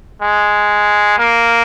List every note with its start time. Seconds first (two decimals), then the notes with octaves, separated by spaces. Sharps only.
0.22 G#3
1.19 A#3